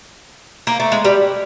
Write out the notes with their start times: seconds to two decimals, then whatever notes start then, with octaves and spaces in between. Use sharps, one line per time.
0.67 A#3
0.80 A3
0.92 G#3
1.05 G3